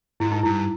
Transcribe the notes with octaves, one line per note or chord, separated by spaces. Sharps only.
G#2 E4
D#4
G2 E4